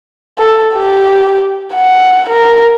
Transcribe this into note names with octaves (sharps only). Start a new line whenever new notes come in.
A4
G4
F#5
A#4